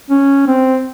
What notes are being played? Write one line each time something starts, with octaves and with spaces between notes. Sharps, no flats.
C#4
C4